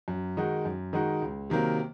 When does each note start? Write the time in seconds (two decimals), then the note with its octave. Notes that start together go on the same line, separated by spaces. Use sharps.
0.08 F#2
0.37 D#3 G#3 D#4 F#4
0.65 F#2
0.93 D#3 G#3 D#4 F#4
1.22 C#2
1.50 C3 D#3 F#3 A#3